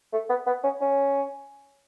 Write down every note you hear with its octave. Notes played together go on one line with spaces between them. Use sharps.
A3
B3
B3
C#4
C#4